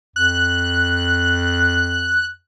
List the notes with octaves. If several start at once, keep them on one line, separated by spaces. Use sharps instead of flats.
F2 F#6